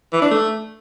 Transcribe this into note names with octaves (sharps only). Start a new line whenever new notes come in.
E3
D4
A3